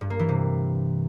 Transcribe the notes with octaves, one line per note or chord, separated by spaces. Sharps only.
G2
A#3
E3
C3